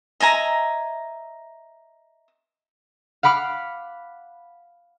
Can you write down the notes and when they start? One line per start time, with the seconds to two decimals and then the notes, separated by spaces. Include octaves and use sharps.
0.20 D#5 E5 G#5 A#5
3.23 F5 F#5 B5 D6 F6